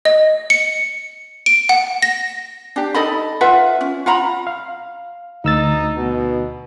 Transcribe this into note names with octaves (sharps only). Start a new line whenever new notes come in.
D#5
C#7
D7
F#5
A#6
D4 G4
D#4 A4 D#5 B5
F4 B4 E5 F#5
C#4
F4 F#5 A#5 B5
F5
D2 D#4 E6 A6
B2